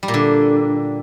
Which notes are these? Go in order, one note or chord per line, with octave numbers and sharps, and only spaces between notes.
G3
A#2
D3